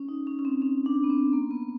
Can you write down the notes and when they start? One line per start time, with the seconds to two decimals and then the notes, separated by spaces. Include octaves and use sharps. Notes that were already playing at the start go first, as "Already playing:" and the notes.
Already playing: C#4
0.09 D#4
0.27 C#4
0.39 C#4
0.45 C4
0.62 C#4
0.86 D4
1.04 B3
1.10 C4
1.33 A#3
1.51 B3